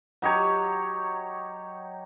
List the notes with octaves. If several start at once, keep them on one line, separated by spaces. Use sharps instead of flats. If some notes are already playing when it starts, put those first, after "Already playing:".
F#3 D#4 G4 C#5